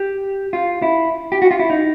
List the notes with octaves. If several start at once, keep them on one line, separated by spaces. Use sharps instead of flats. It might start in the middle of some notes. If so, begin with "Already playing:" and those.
Already playing: G4
F4
E4
G4
F#4
F4
E4
D#4